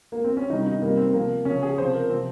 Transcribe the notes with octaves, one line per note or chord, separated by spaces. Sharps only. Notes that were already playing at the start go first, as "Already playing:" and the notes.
A#3
C4
C#4
C3 D#3 G3 D#4
D#4
C3 D#3 G3 A#3
C4
C3 F3 A#3
C#3 F3 C#4
G#4
C3 F3 C5
A#4
C3 F3 C4